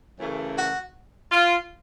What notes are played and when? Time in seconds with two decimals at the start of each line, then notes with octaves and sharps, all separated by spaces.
0.18 F#2 C#3 E3 A3
0.56 F#4
1.31 F4